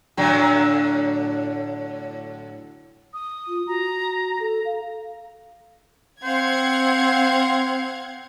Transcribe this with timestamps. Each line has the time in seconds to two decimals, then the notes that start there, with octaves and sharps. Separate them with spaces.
0.17 A2 D3 F#3
3.13 D#6
3.48 F4
3.67 F#4 A#5
4.40 A4
4.65 F5
6.24 C4 C5 F5 F#5 G#6